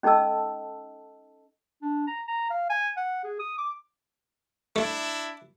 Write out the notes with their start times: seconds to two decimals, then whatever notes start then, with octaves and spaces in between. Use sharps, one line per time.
0.03 C#4 D#4 A4 D#5 A5 E6
1.82 D4
2.07 A#5
2.28 A#5
2.50 F5
2.70 G#5
2.97 F#5
3.24 G#4
3.39 D#6
3.58 D6
4.76 A3 D4 E4